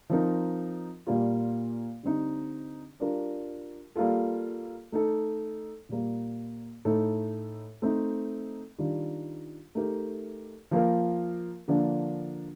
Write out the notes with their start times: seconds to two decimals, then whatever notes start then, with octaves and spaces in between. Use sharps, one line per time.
0.10 F3 C4 D#4 A#4
1.07 A#2 G3 A#3 F4
2.03 D3 G3 C4 D#4
3.00 G3 D4 F4 A#4
3.96 G3 A#3 F4 A4
4.92 A3 D#4 A4
5.89 A#2 G3 A#3
6.85 A2 A3 D#4 A4
7.82 A3 C4 D#4
8.78 D#3 G3 D4 F4
9.75 A3 D#4 G4 A#4
10.71 F3 A#3 F4 A#4
11.68 D3 F3 A#3 D4